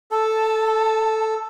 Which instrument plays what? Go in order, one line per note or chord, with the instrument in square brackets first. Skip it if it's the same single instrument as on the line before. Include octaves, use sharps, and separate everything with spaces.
[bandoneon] A4 [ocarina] A5